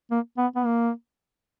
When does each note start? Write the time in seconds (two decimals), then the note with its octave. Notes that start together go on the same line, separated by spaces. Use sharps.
0.11 A#3
0.38 B3
0.56 B3
0.66 A#3